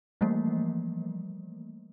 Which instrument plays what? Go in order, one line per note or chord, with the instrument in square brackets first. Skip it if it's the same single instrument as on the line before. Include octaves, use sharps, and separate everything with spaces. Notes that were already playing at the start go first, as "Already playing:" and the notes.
[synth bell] E3 F3 G3 A3 A#3